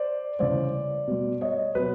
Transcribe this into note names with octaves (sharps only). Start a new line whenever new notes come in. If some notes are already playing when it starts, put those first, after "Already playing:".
Already playing: C5 D5
C#3 E3 G3 C5 D5
B2 G3
C#5 D#5
B2 F#3 B4